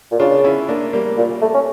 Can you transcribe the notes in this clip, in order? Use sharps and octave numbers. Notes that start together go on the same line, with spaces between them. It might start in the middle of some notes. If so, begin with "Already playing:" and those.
A#2
C#3 D4 F4
C#4 E4
A#3 D4
G3 A#3
A#2
A3
C#4